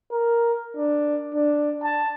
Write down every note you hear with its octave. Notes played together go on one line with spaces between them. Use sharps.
A#4
D4
D4
A5